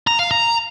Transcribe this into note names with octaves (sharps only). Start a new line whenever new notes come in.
A#5
F5
A#5